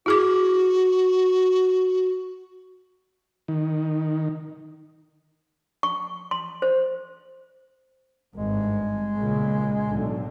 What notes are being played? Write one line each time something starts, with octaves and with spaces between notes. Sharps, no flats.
E4 F#4 G#4 D6
D#3
C#6
C6
C5
G#1 G2 G#3
B1 A#2 C#3
B1 A2 D3